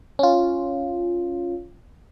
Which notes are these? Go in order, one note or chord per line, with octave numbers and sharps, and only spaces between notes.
C#4 F4